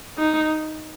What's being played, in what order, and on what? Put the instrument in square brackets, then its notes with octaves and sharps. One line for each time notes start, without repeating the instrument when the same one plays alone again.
[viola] D#4